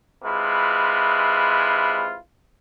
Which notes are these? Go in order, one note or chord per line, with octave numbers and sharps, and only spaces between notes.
C3 G#3 E4 F4 B4